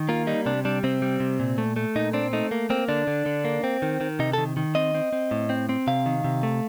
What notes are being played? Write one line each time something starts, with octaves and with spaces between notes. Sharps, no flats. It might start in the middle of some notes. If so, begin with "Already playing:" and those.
Already playing: D#3
A#3 F4
G3 D#4
C3 D4
G3 D4
C3 C4
G3
C3
A#2
A3
A3
A#2 D#4
C4 D4
A3 D#4
A#3
A#3 C4
D3 D4
D3
D3
A#3
C4
D#3
D#3
C3 D#4
D#3 A4
D#3
C4 D#5
C4
C4
A2
C4
C4
C3 F5
D#3
C3
A3